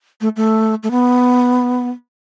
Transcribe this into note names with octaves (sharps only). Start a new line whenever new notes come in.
A3
A3
A3
B3